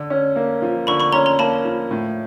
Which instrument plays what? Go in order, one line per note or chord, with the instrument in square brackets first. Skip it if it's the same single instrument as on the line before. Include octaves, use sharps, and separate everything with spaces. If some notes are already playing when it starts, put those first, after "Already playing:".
Already playing: [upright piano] D3
C#4
A#3
F3
[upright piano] D3 [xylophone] B5 C#6
[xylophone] B5 C#6
[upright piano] C#4 [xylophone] A#5 C6
[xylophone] A#5 C6
[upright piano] A#3 [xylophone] A5 B5
[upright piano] F3
A2